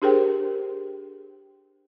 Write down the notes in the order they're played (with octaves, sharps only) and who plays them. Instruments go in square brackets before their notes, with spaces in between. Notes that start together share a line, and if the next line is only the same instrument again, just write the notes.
[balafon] D4 G4 G#4 A#4 C5 G5